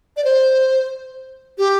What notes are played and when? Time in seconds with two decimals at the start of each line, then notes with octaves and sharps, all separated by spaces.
0.17 D5
0.25 C5
1.58 G4